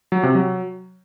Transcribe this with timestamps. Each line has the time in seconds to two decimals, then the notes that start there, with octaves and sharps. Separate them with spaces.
0.12 F#3
0.23 C3
0.35 F#3